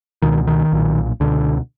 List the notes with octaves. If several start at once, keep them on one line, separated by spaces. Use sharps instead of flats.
C#2 B2 D#3
D#3
B1 A#2
C#2 B2 D3